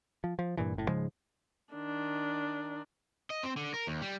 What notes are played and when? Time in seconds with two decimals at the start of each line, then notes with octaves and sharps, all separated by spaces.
0.24 F3
0.39 F3
0.57 G2 A#2 E3
0.74 F#1 A2
0.88 G#2 C#3 F3 G#3
1.74 D#3 D4
3.30 D#5
3.43 C4
3.57 D3
3.74 A#4
3.87 D#2
4.02 G3